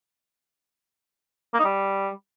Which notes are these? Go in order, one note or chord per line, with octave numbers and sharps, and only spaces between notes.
A#3
D#4
G3